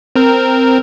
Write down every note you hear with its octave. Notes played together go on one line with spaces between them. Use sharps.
C4 A#4